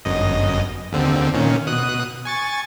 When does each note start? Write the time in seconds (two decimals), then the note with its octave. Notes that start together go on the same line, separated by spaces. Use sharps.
0.05 G1 F#2 D#5
0.93 D#2 D3 C4
1.34 A#2 D#3 C#4
1.67 B2 D#6 F#6
2.25 G#5 C#6 A6